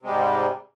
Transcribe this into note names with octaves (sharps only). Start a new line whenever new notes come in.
G#2 C3 G3 G#3